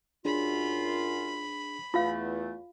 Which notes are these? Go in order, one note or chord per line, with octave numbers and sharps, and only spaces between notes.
F#2 D4 F4 G#4 B5
E2 A3 F4 F5